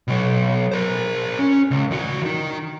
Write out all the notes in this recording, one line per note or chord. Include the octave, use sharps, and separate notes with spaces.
B2 F#3
A#4 C5
C#4
C#2
D#3 F#4
D#3 D#4